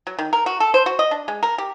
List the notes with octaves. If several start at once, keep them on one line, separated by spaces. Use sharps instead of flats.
F#3
D#3
A#4
F#4
A4
C5
F#4
D#5
D4
G#3
A#4
G4